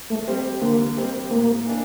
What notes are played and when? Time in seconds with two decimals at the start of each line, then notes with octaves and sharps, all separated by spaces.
0.10 A3
0.28 G3 C4 G4
0.61 D3 A#3
0.97 G3 C4 G4
1.31 A2 A#3
1.66 E3 A#3 D4